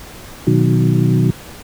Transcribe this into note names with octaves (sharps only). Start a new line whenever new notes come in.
B2 D#3 F#3